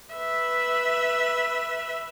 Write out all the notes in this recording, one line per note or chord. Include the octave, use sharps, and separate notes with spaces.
B4 E5